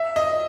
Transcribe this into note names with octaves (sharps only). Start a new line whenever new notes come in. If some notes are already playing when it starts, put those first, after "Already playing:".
Already playing: E5
D#5